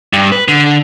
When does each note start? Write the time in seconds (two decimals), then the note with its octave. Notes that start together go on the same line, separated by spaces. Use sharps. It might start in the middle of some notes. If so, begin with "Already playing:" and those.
0.13 G2
0.32 B4
0.48 D3